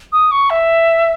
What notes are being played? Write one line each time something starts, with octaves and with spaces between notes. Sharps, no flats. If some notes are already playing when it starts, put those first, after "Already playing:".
D#6
C#6
E5